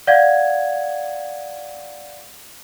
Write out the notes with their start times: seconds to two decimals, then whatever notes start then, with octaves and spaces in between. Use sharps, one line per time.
0.07 D5 F5 F#5 G#6